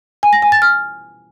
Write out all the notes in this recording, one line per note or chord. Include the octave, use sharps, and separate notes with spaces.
G#5
A#6
G#5
A6
F6